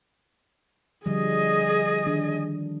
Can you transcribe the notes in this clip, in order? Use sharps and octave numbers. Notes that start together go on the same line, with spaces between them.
D3 F3 G3 G#4 D#5
D#3 D4